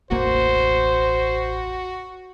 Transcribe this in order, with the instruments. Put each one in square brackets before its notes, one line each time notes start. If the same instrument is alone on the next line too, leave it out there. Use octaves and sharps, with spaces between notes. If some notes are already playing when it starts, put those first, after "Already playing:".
[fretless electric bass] E1 A1 A#3 [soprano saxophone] F#4 [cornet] C5